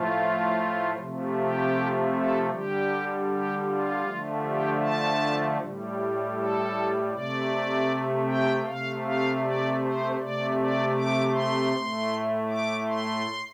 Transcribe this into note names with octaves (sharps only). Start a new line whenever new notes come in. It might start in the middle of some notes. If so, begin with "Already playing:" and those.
Already playing: A2 F3 A3 F4
C3 F3 A3
G4
A4
D3 G3 G4
G4
F4
D3 F3 A3
G4
A5
A2 G3
A4
C3 A3 D5
G5
C3 A3 F5
F5
D5
C5
C3 A3 D5
D5
D6
C6
A2 A3
D6
C6